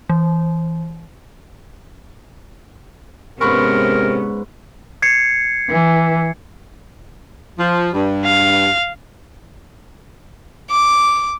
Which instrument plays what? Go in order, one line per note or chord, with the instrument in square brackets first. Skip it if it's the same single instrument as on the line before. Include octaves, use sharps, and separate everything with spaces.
[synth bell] E3
[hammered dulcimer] G#2 B4 C#6 [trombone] C3 [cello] B3 C#4 [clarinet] A#4
[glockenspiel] G#6 C7 C#7
[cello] E3
[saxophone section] F3
G2
[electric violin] F5
[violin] D6